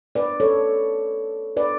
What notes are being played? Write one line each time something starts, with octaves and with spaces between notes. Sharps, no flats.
B4 D5
A4 C#5
B4 D5